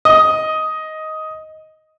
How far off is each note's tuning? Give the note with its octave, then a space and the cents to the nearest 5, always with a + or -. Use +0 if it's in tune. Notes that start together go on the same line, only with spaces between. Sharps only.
D#5 +10